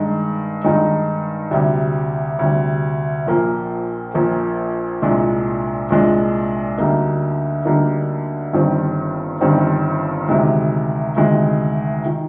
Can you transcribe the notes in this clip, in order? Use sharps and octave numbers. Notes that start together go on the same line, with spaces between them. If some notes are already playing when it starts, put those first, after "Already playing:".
Already playing: G2 D#3 G#3 D#4
G2 D#3 G#3 D#4
D2 C3 G3
D2 C3 G3
A#1 A#2 F3 A#3
A#1 A#2 F3 A#3
C2 A#2 G#3 D4
C2 A#2 G#3 D4
D2 D3 G3 A#3 D#4
D2 D3 G3 A#3 D#4
G1 G2 D#3 G3 C4
G1 G2 D#3 G3 C4
D2 C3 D#3 G#3
D2 C3 D#3 G#3
D#3